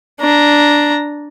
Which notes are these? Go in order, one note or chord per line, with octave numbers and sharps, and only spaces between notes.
D4 A#5